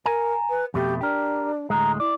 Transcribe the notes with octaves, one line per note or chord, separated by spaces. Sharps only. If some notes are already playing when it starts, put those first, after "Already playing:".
A#4 G#5 A#5
B4
F2 B2 A3 G4
D4 G4 A#4
D2 A2 G#3 A#5
E4 D5